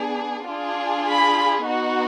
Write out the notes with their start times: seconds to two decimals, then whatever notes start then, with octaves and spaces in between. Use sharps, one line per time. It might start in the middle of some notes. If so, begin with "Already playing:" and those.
Already playing: B3 D4 G#4
0.47 D4 F4 G#4
1.06 B5
1.65 B3 D#4 F#4